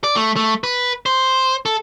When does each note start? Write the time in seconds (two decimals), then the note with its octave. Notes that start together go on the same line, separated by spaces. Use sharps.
0.04 D5
0.16 A3
0.36 A3
0.64 B4
1.06 C5
1.66 A4